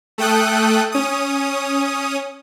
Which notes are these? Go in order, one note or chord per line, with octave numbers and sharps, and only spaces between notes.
A3 A4 G5 D#6 F#6
C#4 D#6